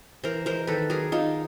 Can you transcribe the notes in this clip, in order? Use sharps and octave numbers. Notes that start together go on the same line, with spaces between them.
E3 A#4 C5
G#3 A#4 C5
D#3 A4 B4
F#3 G#4 A#4
D#3 D#4 F4